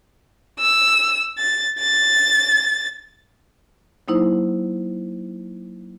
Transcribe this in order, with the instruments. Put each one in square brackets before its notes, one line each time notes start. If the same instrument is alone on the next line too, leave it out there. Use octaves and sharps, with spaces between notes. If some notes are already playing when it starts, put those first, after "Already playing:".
[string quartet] E6
A6
A6
[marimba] F#3 A#3 D#4 E4 C5